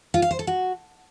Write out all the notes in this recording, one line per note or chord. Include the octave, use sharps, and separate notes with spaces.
F4
F5
C5
A4
F#4